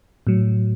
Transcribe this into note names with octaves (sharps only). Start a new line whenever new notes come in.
A2 F#3